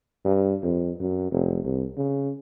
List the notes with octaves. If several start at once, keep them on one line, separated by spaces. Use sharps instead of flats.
G2
F2
F#2
F1
C2
C#3